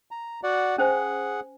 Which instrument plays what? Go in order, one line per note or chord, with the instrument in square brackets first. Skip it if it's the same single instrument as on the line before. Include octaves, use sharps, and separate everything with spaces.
[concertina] A#5
F#4 D5 F#5
[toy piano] C#4 C5 G#5 [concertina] G#4 F#5